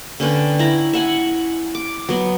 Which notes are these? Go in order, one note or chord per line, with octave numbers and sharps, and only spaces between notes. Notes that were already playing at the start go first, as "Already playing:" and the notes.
D3 C#4 B4 G5
E4 A#5
E5 F#5 G#5
D6
F#3 B3